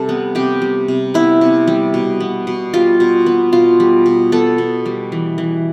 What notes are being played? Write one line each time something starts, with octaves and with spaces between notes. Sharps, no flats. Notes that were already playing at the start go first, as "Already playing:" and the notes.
Already playing: C3 G3 A4
B3
C3 G4
G3
C3
B3 E4
C3
G3
B2
B3
B2
G3 F4
B2
B3
B2 F4
G3
B2
B3 A4
B2
G3
E3
E3